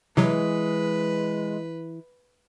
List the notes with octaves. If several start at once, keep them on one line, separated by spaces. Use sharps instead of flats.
C3 E3 F#3 G#3 B4